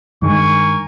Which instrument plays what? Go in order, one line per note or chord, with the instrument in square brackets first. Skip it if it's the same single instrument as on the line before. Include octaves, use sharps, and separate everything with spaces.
[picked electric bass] G2 D#3 G#3 [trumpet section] A#4 G#5 C#6